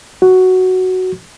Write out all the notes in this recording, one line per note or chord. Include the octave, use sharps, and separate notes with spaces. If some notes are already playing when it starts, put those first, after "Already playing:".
F#4